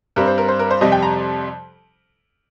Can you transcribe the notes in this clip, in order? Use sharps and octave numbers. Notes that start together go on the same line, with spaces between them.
G2 G3 C4 A#4
C5
A#4
C5
A#4
C5
F2 C3 G3 D#5
G5
A#5